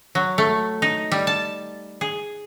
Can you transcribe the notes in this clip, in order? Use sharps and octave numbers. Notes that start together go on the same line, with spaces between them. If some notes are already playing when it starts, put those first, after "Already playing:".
F#3
A3
D#4
G3
A5
G#4